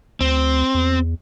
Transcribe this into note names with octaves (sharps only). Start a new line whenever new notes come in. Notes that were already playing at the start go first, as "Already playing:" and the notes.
D2 C4
E2